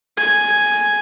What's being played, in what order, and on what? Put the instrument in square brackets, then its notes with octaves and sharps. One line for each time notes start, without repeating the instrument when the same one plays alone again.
[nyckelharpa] G#5